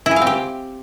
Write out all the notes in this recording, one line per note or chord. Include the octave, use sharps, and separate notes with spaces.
E4
G#4
F5
C4
G4